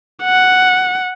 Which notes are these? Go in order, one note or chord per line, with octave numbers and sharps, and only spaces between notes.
F#5